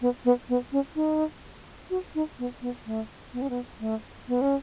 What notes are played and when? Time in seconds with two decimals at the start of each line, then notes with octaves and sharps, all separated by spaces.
0.02 B3
0.25 B3
0.49 B3
0.72 C#4
0.95 D#4
1.90 F#4
2.15 D#4
2.39 B3
2.62 B3
2.86 A3
3.33 B3
3.42 C#4
3.50 B3
3.80 A3
4.28 B3
4.41 C#4